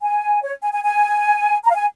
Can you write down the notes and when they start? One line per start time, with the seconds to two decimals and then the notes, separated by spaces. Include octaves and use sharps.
0.02 G#5
0.43 C#5
0.62 G#5
0.73 G#5
0.84 G#5
1.64 A#5
1.70 F5
1.76 G#5